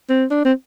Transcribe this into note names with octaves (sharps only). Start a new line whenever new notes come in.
C4
D4
C4